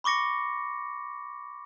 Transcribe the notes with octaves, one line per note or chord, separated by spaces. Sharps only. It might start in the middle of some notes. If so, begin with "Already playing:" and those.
B5 C#6 D6 A#6 C#7